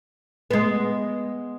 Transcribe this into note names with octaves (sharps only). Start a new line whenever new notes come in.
G#3 B3